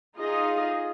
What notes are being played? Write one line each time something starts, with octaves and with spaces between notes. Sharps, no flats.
D#4 F4 G#4 D#5